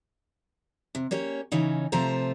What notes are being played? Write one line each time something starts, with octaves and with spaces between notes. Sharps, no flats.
C3
A#3 C#4 G4 C#5
C#3 E3 C#4 D#4
C3 F3 A3 F4 C5 A#5